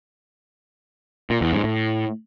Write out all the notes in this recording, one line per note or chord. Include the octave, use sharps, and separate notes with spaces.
A#2
E2
G#2
A2